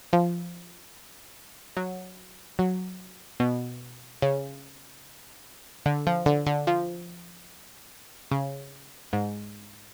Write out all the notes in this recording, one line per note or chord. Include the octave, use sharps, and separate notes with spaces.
F3
F#3
F#3
B2
C#3
D3
F3
D3
D3
F3
C#3
G#2